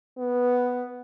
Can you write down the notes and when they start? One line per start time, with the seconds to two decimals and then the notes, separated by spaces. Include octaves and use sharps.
0.18 B3